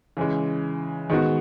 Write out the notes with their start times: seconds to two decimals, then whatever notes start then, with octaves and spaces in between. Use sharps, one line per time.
0.17 C#3 E3 G#3
1.09 D#3 G#3 B3 F#4